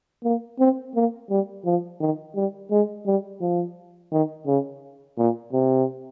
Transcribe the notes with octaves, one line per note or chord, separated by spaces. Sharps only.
A#3
C4
A#3
G3
F3
D#3
G3
G#3
G3
F3
D#3
C#3
A#2
C3